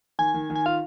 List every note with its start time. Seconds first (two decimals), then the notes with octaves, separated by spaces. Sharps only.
0.19 D#3 G#5
0.34 D#3
0.50 D#3
0.56 G#5
0.66 F4 F5